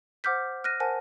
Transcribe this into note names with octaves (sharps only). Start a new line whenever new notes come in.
C5 F#5 D6 F6 G6 B6
F6 F#6 A#6 D#7
A#4 C5 F#5 G#5 A5